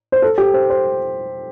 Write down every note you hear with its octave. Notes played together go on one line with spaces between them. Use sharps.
C5
A4
G4
C5
C5